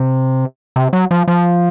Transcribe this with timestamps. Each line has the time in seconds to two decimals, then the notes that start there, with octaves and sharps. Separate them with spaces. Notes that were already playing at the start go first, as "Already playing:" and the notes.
Already playing: C3
0.76 C3
0.93 F#3
1.11 F3
1.28 F3